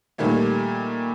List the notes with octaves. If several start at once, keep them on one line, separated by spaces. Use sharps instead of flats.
A#2 D#3 G3 A3 A#3